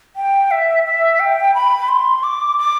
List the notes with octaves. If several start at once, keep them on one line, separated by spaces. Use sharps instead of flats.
G5
E5
E5
G5
B5
C6
D6
D6